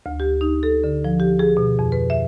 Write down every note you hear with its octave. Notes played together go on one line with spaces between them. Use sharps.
D2
G4
D#4
A4
D3
F3
G4
G#4
B2
F2
B4
E5